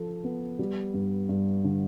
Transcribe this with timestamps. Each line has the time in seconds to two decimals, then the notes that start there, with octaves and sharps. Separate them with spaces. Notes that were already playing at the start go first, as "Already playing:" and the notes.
Already playing: F3 A4
0.24 B3
0.59 G3
0.94 G2
1.29 G2
1.64 D3